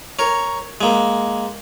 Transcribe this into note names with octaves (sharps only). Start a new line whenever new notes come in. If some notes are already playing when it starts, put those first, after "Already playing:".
A#4 C#5
G#3 A#3